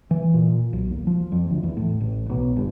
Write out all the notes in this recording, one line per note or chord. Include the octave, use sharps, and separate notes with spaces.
E3
A#2
B1
D#2
F3
F2
D2
E2
A2
A1
B1
G1